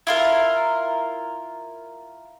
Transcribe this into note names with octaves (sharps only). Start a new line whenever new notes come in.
E4 F4 A#4